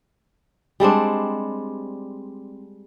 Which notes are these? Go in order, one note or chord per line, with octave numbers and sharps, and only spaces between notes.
G3 G#3 C4 D4